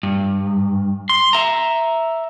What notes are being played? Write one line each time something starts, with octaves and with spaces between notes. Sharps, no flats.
G2
C6
E5 A#5